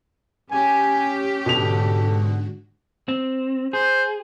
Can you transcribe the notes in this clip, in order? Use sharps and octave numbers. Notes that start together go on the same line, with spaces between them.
C#4 G4 G#5
G#2 B2 D3 F#4 A4 F7
C4
G#4 C5